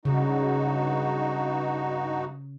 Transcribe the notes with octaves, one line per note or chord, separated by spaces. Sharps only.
G2 C#3 D#4 F#4